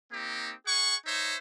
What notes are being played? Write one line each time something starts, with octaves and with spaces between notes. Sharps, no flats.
A#3 C4 D#4 G4
G#4 F#5 G#5 C#6
D#4 C5 C#5 E5